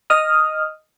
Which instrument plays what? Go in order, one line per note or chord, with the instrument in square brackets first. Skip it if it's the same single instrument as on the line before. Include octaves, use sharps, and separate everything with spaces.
[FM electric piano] D#5 D#6 F6